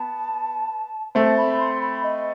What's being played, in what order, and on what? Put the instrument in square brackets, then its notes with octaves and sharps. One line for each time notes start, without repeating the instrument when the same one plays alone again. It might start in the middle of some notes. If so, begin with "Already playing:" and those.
Already playing: [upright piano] B3 [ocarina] A5
[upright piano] A3 C4 [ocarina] A5
[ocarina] B5
C6
B5
D#5